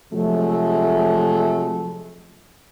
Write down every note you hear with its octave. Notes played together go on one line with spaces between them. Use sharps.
C3 F3 F#3 G#3 A3